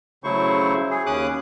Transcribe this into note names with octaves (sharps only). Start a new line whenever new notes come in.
C#3 F#3 A3 E4 C5 C#6
G#4
D#2 C#4 D6 D#6 F#6